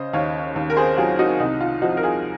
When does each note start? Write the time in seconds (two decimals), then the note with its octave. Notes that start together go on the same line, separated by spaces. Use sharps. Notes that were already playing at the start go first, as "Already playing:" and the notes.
Already playing: C#3 C5 D#5
0.13 D#2 C#5 F5
0.56 D#2
0.70 A#4
0.77 G#4 C5
0.97 F#3 F4 G#4
1.19 D#4 F#4
1.40 C2 D#4
1.60 F4
1.82 F3 D#4 F#4
1.97 A#4
2.03 F4 G#4